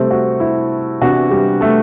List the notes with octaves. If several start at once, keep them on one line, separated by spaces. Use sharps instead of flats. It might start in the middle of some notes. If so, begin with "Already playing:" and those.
Already playing: C3 G3 A3 C4 A4
F#4
E4
C3 E3 B3 D4 F#4
G3 G4
A3 A4